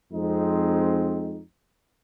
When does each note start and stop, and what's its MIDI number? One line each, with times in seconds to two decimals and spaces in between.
0.13 1.40 41
0.13 1.40 56
0.13 1.40 60
0.13 1.40 63